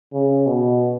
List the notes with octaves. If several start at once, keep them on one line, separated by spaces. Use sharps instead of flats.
C#3
B2